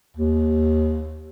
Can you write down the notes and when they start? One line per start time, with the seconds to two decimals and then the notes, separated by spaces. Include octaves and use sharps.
0.17 D#2